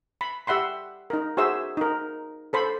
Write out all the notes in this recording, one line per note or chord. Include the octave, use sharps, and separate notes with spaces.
B5
G4 E5 F#5 B5 C6
D#4 A#4
F#4 G#4 C5 E5 E6
D#4 A#4
A4 C5 B5